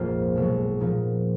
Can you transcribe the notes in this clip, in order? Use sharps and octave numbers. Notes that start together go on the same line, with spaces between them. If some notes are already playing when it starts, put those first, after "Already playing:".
Already playing: A#1 F2 G#2 F3 A#3 F4
B1 B2 G#3
A#2 F3 B3 D#4